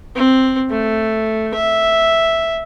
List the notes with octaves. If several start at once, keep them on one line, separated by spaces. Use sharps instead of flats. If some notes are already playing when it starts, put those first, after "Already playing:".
C4
A3
E5